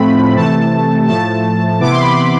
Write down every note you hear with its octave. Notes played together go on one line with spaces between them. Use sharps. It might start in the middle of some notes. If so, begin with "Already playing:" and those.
Already playing: A2 F3 A3 C4 B5
C3 E3 A3 A5
A2 F3 A3 A5
C3 E3 B3 E4 D6
C6
B5
C6